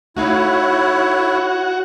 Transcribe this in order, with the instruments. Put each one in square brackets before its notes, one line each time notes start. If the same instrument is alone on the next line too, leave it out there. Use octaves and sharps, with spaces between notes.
[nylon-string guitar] A3 D#4 F5 [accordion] E4 C#5 [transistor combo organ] F#4